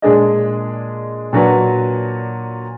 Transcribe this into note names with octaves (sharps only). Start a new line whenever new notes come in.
A#2 G#3 D4 G#4 D#5
A#2 F#3 D4 F#4 B4